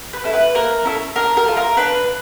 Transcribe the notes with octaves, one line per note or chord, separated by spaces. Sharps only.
B4
C#4 E4 A4
B4
A#3 A#4
C#4 E4 A4
D4 A#4
A#4
F4 A4
A#4
D4 B4